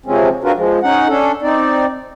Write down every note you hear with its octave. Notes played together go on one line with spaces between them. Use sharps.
C3 F3 G#3 C4 C#4
C4 D4 F4 F#4 A#4 B4
F3 G#3
C#4 D#4 F#5
C#4 D4 A4
C4 D#4 D5